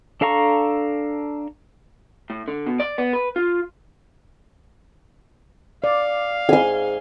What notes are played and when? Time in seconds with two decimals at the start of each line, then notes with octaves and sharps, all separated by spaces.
0.21 D4 A4 F5 A#5 C#6
2.30 A2
2.48 D3
2.66 B2
2.80 D5
2.98 B3
3.13 B4
3.36 F4
5.84 D5 F5
6.49 G#2 G#5 C6